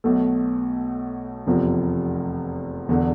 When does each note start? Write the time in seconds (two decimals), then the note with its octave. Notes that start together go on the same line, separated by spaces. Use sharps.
0.04 B1 B2 A3
1.46 F1 E2 C3 F3
2.88 E1 E2 D3